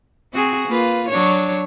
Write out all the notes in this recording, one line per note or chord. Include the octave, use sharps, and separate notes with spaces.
C4 F#4 G#4
A#3 F4 B4
F#3 D4 C#5